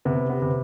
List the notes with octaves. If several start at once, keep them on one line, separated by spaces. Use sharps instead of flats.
C3 B3
B3
C3